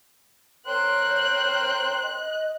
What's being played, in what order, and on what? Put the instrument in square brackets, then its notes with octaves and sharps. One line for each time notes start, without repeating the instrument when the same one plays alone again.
[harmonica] A#4 C5 G5 [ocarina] C#5 [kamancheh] F#6
[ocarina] D#5